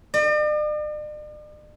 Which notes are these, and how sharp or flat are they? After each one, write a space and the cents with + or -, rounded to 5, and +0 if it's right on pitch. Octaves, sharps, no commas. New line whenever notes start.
D5 +45